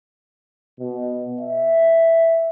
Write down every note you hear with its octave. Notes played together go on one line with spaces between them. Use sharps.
B2
E5